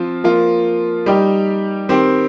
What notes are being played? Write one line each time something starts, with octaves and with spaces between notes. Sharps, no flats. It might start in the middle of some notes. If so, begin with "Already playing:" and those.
Already playing: F3 C4 F4
F3 A#3 F4
G3 D#4 G4
D#3 C4 G4